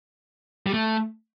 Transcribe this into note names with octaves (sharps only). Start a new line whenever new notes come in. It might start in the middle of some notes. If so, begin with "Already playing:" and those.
G3
A3